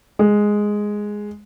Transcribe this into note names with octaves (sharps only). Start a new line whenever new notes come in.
G#3